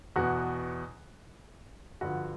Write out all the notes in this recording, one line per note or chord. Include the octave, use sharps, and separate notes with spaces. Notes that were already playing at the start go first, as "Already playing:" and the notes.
E2 B2 F#4
G2 D3 F3 F#4